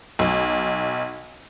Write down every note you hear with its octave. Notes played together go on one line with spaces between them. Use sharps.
B1